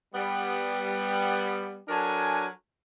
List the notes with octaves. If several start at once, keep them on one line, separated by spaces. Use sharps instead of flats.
G3 B3
F#3 D4 A4 A#4 G#5